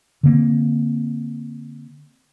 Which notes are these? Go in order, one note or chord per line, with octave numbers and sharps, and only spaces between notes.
D3 A#3 C4